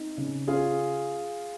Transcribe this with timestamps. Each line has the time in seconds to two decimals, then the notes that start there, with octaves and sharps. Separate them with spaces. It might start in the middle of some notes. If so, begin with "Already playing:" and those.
Already playing: C4 D#4
0.18 C#3
0.47 C#4 F4 G#4